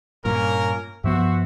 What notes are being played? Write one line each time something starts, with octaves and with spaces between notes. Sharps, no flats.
G2 A#2 A#3 C#4 A#4
G2 F3 B3 F#4 C5 E5